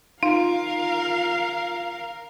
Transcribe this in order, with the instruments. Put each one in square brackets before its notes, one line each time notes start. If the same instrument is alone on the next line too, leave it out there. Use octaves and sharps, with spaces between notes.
[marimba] D#4 [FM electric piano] F4 [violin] A#4 [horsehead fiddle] F5